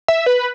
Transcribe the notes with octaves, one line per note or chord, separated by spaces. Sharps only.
E5
B4